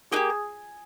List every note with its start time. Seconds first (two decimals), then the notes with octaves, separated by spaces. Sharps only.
0.11 A#3 D#4 G#4
0.16 G4